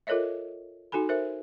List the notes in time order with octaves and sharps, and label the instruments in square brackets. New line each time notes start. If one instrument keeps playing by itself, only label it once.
[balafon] F4 A4 A#4 C#5 D#5 E5
D#4 F#4 A4 G#5 B5
A#4 C5 E5